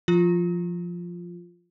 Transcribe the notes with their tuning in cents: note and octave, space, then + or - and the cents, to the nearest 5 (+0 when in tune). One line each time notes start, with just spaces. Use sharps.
F3 +0 F4 +0